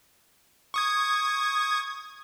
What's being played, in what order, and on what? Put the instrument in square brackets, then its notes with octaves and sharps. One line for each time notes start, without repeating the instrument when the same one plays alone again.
[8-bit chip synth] C#6 D#6 G#6